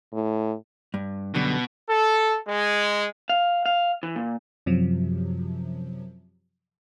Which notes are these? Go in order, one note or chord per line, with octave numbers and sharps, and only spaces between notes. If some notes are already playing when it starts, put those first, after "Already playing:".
A2
G2
F#2 B2 D3 G3
A4
G#3
F5
F5
E3
A#2
F#2 C3 F3 F#3